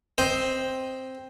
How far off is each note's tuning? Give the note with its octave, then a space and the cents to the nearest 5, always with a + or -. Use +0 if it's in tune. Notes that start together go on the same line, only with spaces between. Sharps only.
C4 +0 C5 +0 D#5 +0